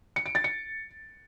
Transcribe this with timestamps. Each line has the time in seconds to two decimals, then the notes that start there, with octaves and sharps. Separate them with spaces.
0.16 C#7
0.26 D7
0.35 A6
0.44 C#7